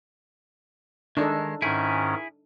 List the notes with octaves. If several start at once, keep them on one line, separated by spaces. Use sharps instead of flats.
D#3 G#3 D4 D#4 A4
G#2 D#3 C#4 E4 G#4